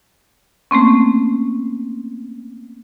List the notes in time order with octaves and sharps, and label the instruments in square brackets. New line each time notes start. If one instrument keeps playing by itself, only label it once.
[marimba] A3 A#3 C4 C#4